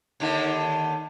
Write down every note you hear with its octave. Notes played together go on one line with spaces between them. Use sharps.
D#2 D3 D#3